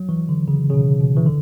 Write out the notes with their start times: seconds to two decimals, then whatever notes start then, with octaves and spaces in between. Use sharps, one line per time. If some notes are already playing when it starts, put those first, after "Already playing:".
Already playing: F#3
0.09 E3
0.29 D3
0.48 C#3
0.70 C#3
0.74 B2
1.00 B2
1.16 E3
1.26 D3